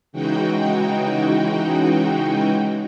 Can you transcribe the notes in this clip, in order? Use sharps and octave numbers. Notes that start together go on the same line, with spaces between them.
C#3 E3 G#3 D#4 F#4 G5